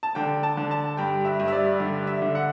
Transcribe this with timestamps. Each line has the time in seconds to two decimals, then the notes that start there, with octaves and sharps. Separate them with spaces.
0.03 A5
0.15 D3 G5
0.43 A5
0.57 D3
0.71 A5
0.97 G2 G5
1.25 E5
1.40 G2
1.48 E5
1.52 D5
1.80 D3 D5
2.07 E5
2.22 D3
2.35 F#5